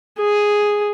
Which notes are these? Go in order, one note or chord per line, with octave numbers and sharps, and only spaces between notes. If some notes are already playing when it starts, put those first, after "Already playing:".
G#4